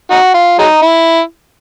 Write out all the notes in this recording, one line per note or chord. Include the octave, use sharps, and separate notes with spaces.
D#4 F#4
F4
F#3 G#3 D#4
E4